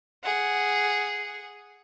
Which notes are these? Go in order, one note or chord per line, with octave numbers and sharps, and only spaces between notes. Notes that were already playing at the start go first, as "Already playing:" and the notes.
G#4 F#5